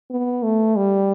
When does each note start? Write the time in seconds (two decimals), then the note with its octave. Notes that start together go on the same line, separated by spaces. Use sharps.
0.10 B3
0.43 A3
0.76 G3